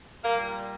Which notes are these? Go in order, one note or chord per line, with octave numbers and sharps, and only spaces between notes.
A#2 G3 A#3